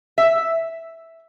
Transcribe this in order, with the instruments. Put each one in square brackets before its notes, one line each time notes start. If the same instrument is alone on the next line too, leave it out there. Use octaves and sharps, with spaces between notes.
[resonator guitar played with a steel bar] E5